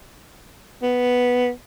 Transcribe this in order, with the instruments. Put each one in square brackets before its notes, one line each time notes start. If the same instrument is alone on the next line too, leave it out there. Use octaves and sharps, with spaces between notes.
[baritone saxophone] B3